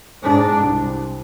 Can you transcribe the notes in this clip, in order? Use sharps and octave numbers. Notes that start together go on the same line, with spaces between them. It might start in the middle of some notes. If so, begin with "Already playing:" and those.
G#2 D4
C2